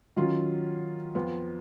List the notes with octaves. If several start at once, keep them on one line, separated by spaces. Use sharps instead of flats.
D#3 F#3 C#4 F4
F2 F3 B3 F4